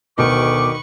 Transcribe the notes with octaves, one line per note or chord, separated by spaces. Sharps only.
D2 B2 D#3 B4 C#6 D6 D7